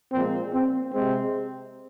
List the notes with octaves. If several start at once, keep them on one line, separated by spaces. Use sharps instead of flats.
A#2 F3 G#3 C4
C4
C3 G#3 C4